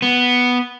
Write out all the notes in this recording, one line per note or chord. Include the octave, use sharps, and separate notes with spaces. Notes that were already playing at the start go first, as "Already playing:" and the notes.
B3